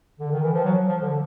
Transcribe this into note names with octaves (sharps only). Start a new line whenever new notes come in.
D3
D#3
E3
F3
F#3
F3
D3